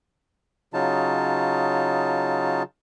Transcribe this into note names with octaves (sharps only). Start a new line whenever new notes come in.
C#3 F#3 D#4 F4 A5